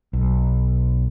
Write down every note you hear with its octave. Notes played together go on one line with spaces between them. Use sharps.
B1